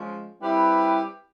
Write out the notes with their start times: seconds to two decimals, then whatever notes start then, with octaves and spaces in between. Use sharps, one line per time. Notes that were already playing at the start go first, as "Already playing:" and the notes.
Already playing: F3 G#3 C#4
0.41 G3 C4 E4 G4 B4